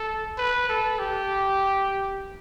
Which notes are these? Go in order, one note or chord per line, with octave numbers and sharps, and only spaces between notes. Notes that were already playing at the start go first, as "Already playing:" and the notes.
Already playing: A4
B4
A4
G4